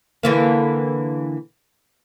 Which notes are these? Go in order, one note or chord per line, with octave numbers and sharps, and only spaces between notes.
D3 E3 A#3